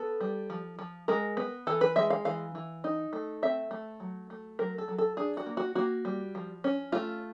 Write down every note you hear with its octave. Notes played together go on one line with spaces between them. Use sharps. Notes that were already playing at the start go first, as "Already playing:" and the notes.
Already playing: B3 A4
G3
F3
F3
G#3 A#4
B3
E3 A4
B4
G#3 E5
F5
E3 F5
E3
D#4
A3
C4 E5
A3
F#3
A3
F#3 A#4
A4
F#3
A4
D4 G#4
F#4
A#3
F#4
A#3 F#4
G3
F3
C#4
A3 F4